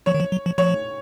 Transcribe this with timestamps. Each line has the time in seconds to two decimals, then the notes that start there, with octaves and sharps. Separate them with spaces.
0.06 F3 C#5
0.15 D#3
0.20 F3
0.32 F#3
0.46 F3
0.58 F3 C#5